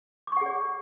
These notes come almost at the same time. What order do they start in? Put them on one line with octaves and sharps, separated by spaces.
D6 C#6 F#5 G#4 D5